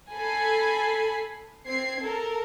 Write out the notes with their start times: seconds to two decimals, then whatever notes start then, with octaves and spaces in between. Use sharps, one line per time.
0.13 A4 G#5 B5 C7
1.67 C4 G#6 C7
2.01 A4 A#4